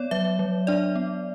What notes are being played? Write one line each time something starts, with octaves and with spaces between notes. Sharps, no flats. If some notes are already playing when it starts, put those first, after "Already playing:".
Already playing: B3 C#5 D5
F#3 E5
F#3
D4 D5
B3